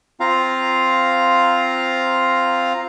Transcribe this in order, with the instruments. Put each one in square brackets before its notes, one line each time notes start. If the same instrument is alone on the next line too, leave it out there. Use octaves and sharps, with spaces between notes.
[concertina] C4 F4 F5 A#5